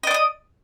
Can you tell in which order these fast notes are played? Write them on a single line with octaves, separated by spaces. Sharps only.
D#5 D5 D6 D#6